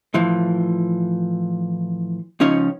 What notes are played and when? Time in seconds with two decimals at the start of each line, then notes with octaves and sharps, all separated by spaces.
0.14 A2 E3 F3
2.40 C#2 F3 C#4 D#4 C#5